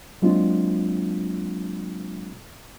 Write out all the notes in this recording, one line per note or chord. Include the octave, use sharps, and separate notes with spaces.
F#3 G#3 A#3 C4 D4 F4